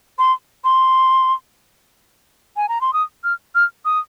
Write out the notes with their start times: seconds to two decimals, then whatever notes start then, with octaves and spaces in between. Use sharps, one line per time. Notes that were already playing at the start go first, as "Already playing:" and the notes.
0.19 C6
0.64 C6
2.56 G#5
2.69 A#5
2.81 C6
2.93 D#6
3.24 F6
3.55 F6
3.85 D#6